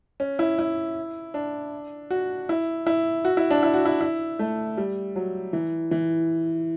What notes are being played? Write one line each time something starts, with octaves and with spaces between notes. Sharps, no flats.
C#4
E4
E4
D4
F#4
E4
E4
F#4
E4
D4
E4
F#4
E4
E4
A3
G3
F#3
E3
E3